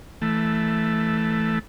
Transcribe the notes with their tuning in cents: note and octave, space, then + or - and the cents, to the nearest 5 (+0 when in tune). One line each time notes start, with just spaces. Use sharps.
E3 +0 A3 +0